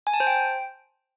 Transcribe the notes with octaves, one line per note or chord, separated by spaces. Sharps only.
G#5
A5
C5
G5